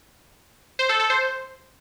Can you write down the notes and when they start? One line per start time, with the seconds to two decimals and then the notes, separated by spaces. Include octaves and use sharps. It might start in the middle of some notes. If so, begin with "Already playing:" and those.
0.79 C5
0.89 A4
1.00 A4
1.10 C5